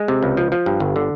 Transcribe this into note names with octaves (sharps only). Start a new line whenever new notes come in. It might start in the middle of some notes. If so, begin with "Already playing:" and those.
Already playing: G#3
C3
C#2
F3
F3
G2
G1
D3